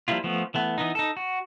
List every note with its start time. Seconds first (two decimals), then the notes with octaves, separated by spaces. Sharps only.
0.08 F3 G3 A#3 E4 F4
0.24 F3 A3 B3
0.54 E3 A3 B3
0.78 E3 B3 D#4
0.95 D#4 A4
1.17 F#4